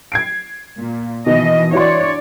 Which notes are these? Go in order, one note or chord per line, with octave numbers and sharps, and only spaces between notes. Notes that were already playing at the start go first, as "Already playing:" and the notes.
G#6 C7 D7
A#2
B2 D#3 E3 D#5
E3 D4 F#4 C#5 D5 C6